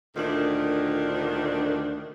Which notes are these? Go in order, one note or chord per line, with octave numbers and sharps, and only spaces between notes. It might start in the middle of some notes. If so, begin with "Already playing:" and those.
D2 A#2 D#3 D4